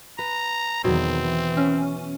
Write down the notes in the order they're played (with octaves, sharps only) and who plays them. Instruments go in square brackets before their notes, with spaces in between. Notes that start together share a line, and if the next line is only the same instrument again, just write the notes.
[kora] B4 [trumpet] A#5
[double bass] E2 D#3 [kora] B2 F#3 [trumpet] C4
[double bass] E3
[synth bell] C#4